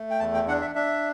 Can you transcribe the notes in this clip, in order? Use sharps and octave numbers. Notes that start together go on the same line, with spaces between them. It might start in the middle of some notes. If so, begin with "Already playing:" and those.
Already playing: A3
G5
E2 A5
G5
D4 F#5
E5
D4 E5